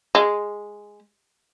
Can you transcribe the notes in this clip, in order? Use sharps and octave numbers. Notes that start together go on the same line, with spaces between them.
G#3